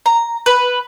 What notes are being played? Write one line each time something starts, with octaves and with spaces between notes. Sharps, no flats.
A#5
B4